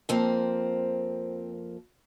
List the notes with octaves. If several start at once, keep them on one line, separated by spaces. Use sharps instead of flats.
F2 F3 A#3 C4